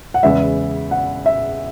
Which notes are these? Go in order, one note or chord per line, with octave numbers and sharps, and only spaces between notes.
F#5
E2 C#3 G#3 B3 E5
F#5
E5